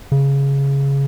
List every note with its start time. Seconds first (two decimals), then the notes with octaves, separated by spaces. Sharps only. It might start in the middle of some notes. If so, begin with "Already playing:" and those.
0.12 C#3